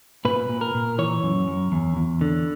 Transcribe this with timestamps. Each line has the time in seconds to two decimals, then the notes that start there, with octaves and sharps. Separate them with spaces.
0.25 A#2 B4
0.49 A#2
0.61 A#4
0.74 A#2
0.98 E3 C#5
1.23 F#2
1.48 F#2
1.72 E2
1.97 E2
2.21 D3